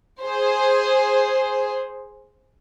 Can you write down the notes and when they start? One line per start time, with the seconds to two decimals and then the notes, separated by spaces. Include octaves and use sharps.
0.22 G#4 C5